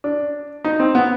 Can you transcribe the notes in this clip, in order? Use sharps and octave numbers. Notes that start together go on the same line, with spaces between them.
D4
D#4
C4
B3